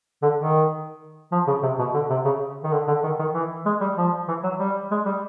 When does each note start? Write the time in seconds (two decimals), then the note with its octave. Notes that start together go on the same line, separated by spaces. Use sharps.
0.23 D3
0.39 D#3
1.32 F3
1.47 C#3
1.63 C3
1.79 B2
1.94 D3
2.10 C3
2.25 C#3
2.64 D#3
2.72 D3
2.88 D3
3.04 D#3
3.19 D#3
3.34 E3
3.66 G#3
3.81 G3
3.97 F3
4.28 E3
4.44 F#3
4.60 G3
4.91 G#3
5.06 G3